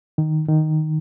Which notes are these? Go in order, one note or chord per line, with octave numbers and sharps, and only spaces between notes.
D#3
D#3